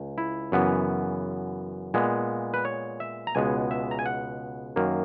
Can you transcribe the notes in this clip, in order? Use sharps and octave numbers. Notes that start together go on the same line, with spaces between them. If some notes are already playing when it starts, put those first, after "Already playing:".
Already playing: C#2
E4
F#2 C#3 E3 B3
A#2 G#3 B3
B4
C#5
E5
A#5
C#2 B2 G#3 B3 G#5
E5
A#5
G#5
F#5
F#2 D#3 A#3